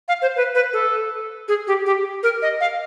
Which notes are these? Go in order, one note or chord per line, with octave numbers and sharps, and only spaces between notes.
F5
C5
B4
B4
A4
G#4
G4
G4
A#4
D#5
F5